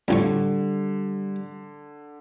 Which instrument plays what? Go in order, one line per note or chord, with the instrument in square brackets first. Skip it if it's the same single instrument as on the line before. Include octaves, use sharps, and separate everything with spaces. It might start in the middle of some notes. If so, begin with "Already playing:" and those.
[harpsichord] F2 A2 C#6 [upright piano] D3 [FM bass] G3